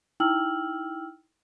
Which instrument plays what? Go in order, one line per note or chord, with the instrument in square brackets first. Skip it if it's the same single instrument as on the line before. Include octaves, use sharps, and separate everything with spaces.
[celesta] D#4 E4 G5 E6 F6 F#7